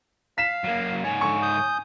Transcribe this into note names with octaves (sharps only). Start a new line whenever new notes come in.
F5 B6 E7
F#3 A#3
G#2 C#5 G#5
D3 C#6
D#6 G6